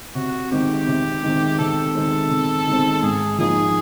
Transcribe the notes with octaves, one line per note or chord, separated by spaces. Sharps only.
C3 F#4
D#3 G#3 C4 G4
C3
D#3 G#3 C4
C3 A4
D#3 G#3 C4
C3
D#3 G#3 C4
G#2 G#4
F3 A#3 D#4 G#4